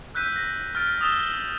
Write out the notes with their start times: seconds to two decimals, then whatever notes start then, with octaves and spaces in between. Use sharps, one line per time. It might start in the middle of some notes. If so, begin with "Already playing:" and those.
0.15 E6 F#6 G6 B6 D#7
0.36 A#6
0.75 F6 A6 D7
1.01 D#6 E6 A6 E7 G7